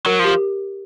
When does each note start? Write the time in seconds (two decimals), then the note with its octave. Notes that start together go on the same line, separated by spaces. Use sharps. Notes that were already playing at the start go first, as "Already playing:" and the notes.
0.06 F#3 A#4
0.19 F3 G4